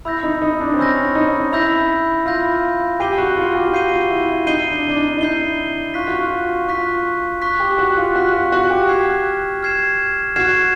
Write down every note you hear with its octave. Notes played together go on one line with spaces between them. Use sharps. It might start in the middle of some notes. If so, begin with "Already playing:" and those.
E4 B5 E6 G6 A#6
D#4
D#4
D4
C4
C#4 B5 E6 G6 A#6
D#4
E4 B5 E6 G6 A#6
F4 B5 E6 G6 A#6
G4 G6 C7 D#7 G7
F#4
F4
G4
F4
F#4 G6 C7 D#7 G7
F#4
E4
E4
D#4 G6 C7 D#7 G7
D4
D4
D#4
D#4
E4 G6 C7 D#7 G7
F4 C#6 F#6 B6
F#4
F4
F4 C#6 F#6 B6
C#6 F#6 B6
G4
F#4
F4
F#4 C#6 F#6 B6
F#4
F#4
G4
F6 G#6 C7 E7
F6 G#6 C7 E7
F#4 F6 G#6 C7 E7